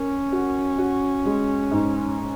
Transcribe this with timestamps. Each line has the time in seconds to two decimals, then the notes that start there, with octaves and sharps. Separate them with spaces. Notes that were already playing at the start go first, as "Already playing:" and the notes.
Already playing: C#4 A#4
0.32 F#4
0.78 F#4
1.25 G#3
1.71 G#2